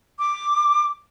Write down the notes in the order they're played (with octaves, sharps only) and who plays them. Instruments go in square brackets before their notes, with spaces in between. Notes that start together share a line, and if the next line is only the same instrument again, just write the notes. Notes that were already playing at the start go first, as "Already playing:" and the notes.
[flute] D6